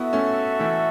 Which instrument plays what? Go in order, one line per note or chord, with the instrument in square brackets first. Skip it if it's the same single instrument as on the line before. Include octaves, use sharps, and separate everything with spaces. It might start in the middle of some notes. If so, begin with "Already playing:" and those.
Already playing: [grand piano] B3 E4 [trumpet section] F#4 A4 E5
[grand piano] A3 C#4
E3 A3